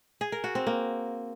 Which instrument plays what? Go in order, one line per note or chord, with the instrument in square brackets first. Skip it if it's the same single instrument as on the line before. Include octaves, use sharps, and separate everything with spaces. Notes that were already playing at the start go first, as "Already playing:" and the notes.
[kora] G#4
A#4
F#4
C4
A#3